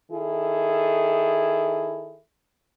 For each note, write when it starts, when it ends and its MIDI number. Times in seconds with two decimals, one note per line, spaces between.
0.11 2.19 51
0.11 2.19 64
0.11 2.19 68
0.11 2.19 69